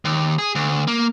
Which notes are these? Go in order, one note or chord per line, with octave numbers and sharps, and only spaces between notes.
D#2
G#4
D2
A#3